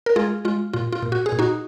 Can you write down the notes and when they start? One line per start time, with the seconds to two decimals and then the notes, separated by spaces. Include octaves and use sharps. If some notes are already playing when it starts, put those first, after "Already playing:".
0.06 A#4
0.16 G#3 F4 G#4
0.45 G#3 F4
0.73 A#2 F4
0.93 F4
1.02 A#2
1.12 F#4
1.26 G#4
1.32 A#2
1.39 D#4 F#4